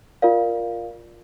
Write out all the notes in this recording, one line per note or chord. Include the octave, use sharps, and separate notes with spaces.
F4 A#4 D5 F5